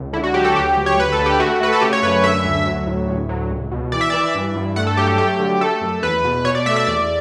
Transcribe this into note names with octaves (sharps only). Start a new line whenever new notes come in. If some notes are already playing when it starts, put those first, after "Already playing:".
Already playing: C#2
D3 E4
F#4
F#3 G4
A4
D2 G4
D2
C#5
D2 B4
A4
D3
G4
A3 F#4
A3 B4
A4
C#3 G4
C#5
F#2 B4
D3 E5
D2
F#3
A2
D2
F#3
C#2
B2
E3 D5
E5
E3 D5
G2
G2
A3 F#5
A4
F#3 G4
G4
A3 G4
D3
A3 A4
F#2
E2 B4
B2
B2 C#5
D5
A3 E5
E5
E2 D5